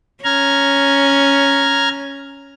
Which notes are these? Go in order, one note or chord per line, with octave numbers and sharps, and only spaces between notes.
C#4 A#5 F6 G#6